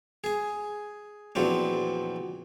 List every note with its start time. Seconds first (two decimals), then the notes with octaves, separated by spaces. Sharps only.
0.24 G#4 G#5
1.35 A#1 E2 F#3 C4 D4